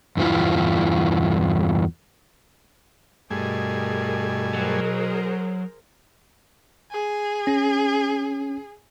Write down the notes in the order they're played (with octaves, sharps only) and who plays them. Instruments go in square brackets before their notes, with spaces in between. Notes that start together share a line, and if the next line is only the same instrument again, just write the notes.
[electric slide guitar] E2 G2 B3 E4 F4
[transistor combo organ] G2 A3 G#5 [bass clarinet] B2 [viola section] G#4 A#4
[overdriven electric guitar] F#3 [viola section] G#4 A#4 C5
[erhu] G#4
[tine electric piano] C#4